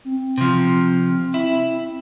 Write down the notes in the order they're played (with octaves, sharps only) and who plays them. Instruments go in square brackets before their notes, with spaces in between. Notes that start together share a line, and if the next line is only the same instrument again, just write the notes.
[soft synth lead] C4
[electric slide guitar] C3 F3
E4